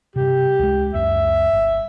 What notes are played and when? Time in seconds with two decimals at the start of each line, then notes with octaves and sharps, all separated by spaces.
0.16 G2 C3 G4
0.59 C#2 G#3
0.94 C#2 F#2 E5
1.53 G1